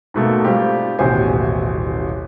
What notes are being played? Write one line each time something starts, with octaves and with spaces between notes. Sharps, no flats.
G#2 B2 A3 A#3
G3 C4 F4 G4
D#1 A1 B2 G4 C5 G#5